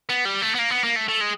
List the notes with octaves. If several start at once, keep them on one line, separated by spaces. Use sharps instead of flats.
B3
G3
A3
B3
A#3
B3
A#3
A3
A3
G#3